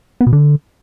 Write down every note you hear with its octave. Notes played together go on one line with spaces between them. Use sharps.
B3
B2
D3